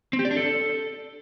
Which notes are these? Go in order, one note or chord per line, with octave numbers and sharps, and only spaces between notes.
C4
G4
D5
D4
A4